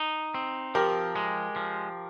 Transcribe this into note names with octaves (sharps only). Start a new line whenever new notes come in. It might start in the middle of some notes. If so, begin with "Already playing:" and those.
Already playing: D#4
C4
F3 G4 A#4
G#3
F3